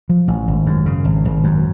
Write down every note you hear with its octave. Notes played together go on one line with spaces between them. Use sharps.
F3
A1
G#1
F#2
C#3
G#1
G#1
F#2